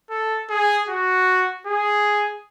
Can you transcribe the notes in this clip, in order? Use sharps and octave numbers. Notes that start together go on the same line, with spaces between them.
A4
G#4
F#4
G#4